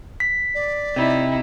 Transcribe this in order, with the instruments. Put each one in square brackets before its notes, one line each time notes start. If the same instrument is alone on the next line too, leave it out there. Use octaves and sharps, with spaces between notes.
[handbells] B6
[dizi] D5
[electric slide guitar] C3 [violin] D#4 E4